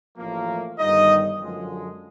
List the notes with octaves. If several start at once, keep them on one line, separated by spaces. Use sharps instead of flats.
A1 A2 F3 A#3
G1 G2 D#3 G3 D#4 D#5
F#2 D3 F3 G#3